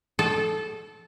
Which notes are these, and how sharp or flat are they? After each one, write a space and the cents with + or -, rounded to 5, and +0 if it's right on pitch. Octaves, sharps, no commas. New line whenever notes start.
A4 -20